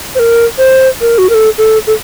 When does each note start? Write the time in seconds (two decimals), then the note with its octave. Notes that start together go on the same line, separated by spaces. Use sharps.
0.15 C5
0.19 A#4
0.58 C5
1.01 A#4
1.18 F#4
1.30 A#4
1.34 A4
1.58 A4
1.87 A4